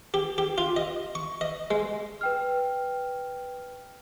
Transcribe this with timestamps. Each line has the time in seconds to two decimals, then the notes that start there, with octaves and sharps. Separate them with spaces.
0.14 G4
0.38 G4
0.58 F4
0.76 D#5
1.15 C#6
1.41 D#5
1.71 G#3
2.21 B4 G5 F6